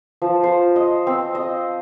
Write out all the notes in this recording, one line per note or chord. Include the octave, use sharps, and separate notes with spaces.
F3
C5
D#5
C4
D#5